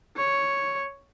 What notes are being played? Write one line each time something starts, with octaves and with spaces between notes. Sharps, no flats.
C#5